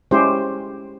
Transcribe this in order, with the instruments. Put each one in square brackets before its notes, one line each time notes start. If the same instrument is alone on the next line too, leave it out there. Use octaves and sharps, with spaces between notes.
[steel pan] G#3 C#4 E4 G4 C5